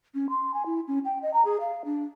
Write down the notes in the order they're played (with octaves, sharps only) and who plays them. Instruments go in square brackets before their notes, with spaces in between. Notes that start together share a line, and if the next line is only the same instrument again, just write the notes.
[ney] C#4
C6
G#5
E4
C#4
G5
D#5
A#5
G#4
F5
D4